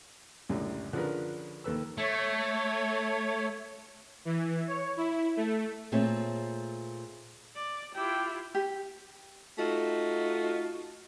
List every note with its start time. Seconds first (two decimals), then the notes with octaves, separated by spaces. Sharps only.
0.49 C#2 F#2 A2 D3 G3
0.93 D3 F3 C#4 G#4 A#4 B4
1.64 D#2 A4 B4 E6
1.98 A3 C#5
4.25 E3
4.68 C#5
4.97 E4
5.37 A3
5.92 A#2 A3 C4 G#4 C#5 E5
7.55 D5
7.95 E4 F4 G4 G5
8.55 G4
9.59 A3 D#4 F4 F#4